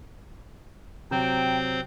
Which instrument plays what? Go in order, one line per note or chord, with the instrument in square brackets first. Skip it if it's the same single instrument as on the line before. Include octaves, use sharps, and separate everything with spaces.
[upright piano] C3 F#3 [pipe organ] C4 C5 [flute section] G5